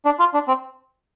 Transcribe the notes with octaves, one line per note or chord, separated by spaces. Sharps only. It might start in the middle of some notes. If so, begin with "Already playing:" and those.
D4
F4
D4
C4